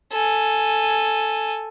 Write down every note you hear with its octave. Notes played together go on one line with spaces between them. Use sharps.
A4 G#5